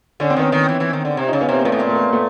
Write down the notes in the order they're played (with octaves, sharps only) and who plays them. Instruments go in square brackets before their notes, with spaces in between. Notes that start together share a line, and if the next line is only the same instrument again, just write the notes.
[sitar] D3 [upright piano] C#4
[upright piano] C4
[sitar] D#3 [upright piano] B3 C#4
[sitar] D#3
E3
E3
D#3
D3
C3
[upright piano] C#4 D#4
[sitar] C#3
[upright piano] B3 C#4
[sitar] C3 [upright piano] A#3 C4
[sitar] A#2 [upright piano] A3 B3
[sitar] A2
[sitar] A#2 [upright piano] A#3
[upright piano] A3
B3
A#3
A3 B3